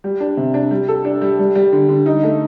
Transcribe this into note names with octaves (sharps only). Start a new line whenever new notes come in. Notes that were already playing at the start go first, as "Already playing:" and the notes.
G3
D4
C3
D4
G3
A4
D4
G3
G3
G3
D3
D3
D#4
A3